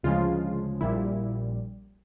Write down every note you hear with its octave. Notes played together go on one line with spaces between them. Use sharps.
D2 C#3 F3 G#3 F4
A#1 A#2 G3 E4